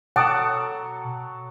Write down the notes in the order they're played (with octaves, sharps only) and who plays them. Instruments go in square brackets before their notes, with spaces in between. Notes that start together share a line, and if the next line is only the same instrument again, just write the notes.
[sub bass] B2 [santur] F#3 A4 [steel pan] F#5 A5 D6 [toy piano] G5 D#6